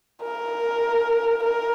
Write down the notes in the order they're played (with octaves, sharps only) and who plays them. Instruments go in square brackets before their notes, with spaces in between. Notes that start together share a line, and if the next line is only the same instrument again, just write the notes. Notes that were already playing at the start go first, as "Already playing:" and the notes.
[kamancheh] A#4
A#4